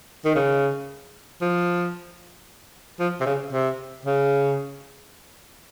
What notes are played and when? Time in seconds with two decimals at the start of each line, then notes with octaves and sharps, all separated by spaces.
0.25 D#3
0.36 C#3
1.42 F3
3.00 F3
3.21 C3
3.26 C#3
3.53 C3
4.06 C#3